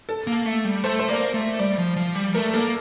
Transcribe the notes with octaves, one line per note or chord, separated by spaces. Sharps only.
A4
A#3
A3
G3
A3 C5
C5
A#3 D5
A3
G3 D5
F3
F3
G3
A3 A#4
A#3 A4